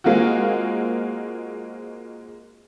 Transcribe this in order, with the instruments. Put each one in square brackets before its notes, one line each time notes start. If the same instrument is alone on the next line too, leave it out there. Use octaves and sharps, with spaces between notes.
[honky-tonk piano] G#3 A#3 C4 F4 F#4